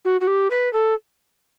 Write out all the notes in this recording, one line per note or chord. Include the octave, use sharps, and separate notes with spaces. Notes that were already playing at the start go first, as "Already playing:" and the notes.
F#4
F#4
G4
B4
A4